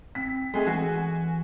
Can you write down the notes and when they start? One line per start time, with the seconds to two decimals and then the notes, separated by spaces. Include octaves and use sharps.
0.15 C4 B6
0.54 G#3 A3 C4 G#4
0.67 E3 F#4 G#5